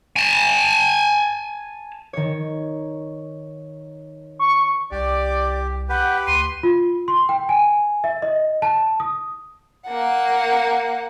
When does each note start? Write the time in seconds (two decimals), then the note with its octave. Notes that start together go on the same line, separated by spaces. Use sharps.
0.16 G#5 A5
2.13 D#3 C#5
4.39 C#6
4.91 C2 G4 D5
5.89 G4 B4 F#5 G5
6.27 D2 C6 D#7
6.63 F4
7.08 C6
7.29 G5
7.49 G#5
8.04 E5
8.22 D#5
8.62 A5
9.00 D#6
9.88 A#3 F#5